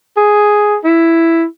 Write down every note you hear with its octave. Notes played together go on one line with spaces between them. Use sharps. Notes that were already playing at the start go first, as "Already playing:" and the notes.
G#4
E4